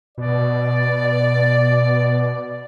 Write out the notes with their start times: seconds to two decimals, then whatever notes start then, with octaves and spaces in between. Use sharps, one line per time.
0.18 B2 D5